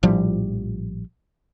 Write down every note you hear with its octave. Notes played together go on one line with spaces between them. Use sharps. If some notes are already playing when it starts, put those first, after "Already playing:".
A#1 A2 F3 G3